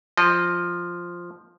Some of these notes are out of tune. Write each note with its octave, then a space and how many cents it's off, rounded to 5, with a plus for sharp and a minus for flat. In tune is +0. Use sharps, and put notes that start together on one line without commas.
F3 +0 D#5 -20